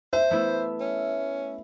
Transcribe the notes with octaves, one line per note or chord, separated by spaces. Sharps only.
C5 E5
A3 B3 E4
C#4